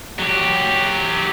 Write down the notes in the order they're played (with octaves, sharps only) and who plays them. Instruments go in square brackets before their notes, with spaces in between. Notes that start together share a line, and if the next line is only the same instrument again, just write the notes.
[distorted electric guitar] F#3 G4